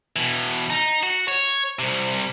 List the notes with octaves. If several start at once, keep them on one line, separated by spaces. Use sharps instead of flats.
B2 E3
D#4
F#4
C#5
C2 C3